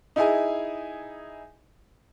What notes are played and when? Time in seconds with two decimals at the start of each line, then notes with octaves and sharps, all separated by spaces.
0.16 D#4 E4 G#4 G#5